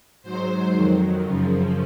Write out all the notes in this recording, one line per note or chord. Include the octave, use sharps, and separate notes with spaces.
G#2 F#3 C5
F2 D#3 F#3
F#2 C#3 F3